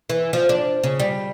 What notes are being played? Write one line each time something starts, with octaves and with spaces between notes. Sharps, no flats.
E3
F3
D4
C#3
G3